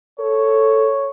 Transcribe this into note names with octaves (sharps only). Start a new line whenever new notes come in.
A4 C#5